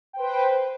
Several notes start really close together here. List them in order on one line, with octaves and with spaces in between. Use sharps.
G5 C5 B4